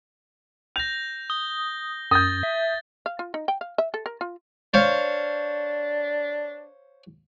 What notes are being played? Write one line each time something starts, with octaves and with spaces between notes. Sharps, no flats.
G6 A#6 F7
D#6 G7
F#2 D#6 G6 A6 A#6
E5
F5
F4
D#4
G5
F5
E5
A4
A#4
F4
D4 C5 C#5 F5